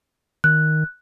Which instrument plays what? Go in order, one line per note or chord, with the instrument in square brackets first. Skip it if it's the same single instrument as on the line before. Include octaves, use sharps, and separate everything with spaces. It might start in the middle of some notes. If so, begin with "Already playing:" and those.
[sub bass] D#3 [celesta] F#6